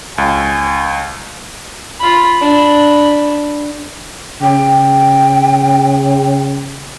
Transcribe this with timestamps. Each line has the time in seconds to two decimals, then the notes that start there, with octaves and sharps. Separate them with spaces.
0.18 C#2 G#5
2.00 F4 B5
2.41 D4 B5
4.42 C#3 G5